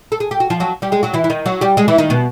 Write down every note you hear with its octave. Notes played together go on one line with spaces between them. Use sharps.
A4
G#4
G4
F#4
F3 F4
F#3 F#4
G3 G4
G#3 G#4
F#3 F#4
E3 E4
E4
D#3 D#4
F#3 F#4
G3 G4
G#3 G#4
E3 E4
D#3 D#4
B2 B3